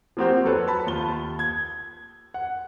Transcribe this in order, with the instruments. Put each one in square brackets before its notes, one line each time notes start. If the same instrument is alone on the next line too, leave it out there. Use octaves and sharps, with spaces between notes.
[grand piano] F3 A#3 C4 F#4 G4 C5
F#3 A4 B4 C#5
A5 B5
D#2 F4 A5 G7
G#6
F#5